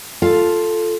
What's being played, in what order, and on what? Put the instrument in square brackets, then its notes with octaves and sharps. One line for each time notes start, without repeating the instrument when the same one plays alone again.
[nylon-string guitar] F4 A4 F5 A5